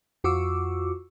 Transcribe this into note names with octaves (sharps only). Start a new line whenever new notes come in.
F2 F4 F#4 C#6 D6 E6